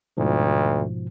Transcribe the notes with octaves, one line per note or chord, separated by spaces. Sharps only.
D2 G#2 B2 F3